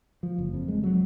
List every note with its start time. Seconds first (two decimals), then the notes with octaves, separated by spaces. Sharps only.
0.23 F3
0.38 F#1
0.54 F2
0.68 G#3
0.83 F#3